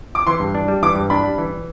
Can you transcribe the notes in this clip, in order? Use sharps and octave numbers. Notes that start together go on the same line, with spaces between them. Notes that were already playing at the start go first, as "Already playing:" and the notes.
D6
E3 C6
G2
D4
G3
E3 D6
G2
D4 B5
G3
E3